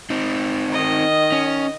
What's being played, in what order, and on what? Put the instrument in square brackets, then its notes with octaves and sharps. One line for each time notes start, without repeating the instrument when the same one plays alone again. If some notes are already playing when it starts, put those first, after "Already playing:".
[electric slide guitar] C4 D#4
[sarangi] D#3 [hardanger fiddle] D#5
[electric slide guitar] C#4